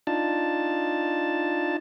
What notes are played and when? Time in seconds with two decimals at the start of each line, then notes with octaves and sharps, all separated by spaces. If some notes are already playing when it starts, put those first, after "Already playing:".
0.07 D4 D#4 F4 A5